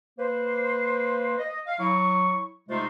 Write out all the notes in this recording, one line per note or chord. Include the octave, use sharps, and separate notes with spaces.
A#3 B4 C5
D#5
F5
F#3 E4 C#6
C3 G#3 A3 D#4 F4 C5